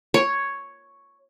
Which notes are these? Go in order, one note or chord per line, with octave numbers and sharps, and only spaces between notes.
C#5